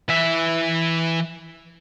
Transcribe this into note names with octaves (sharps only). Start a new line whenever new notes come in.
E3 E5